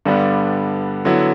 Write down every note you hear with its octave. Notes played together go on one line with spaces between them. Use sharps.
G2 D3 G3 B3 D4
D3 F#3 B3 E4